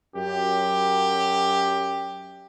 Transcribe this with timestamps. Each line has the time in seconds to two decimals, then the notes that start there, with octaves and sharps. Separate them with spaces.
0.15 F#2 G4